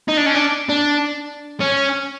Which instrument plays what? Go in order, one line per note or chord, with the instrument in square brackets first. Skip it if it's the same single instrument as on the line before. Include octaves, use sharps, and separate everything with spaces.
[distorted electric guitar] D#4
D4
C#4
D4
D4
C#4